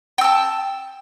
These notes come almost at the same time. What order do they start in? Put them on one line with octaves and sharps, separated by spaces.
G5 E6 A5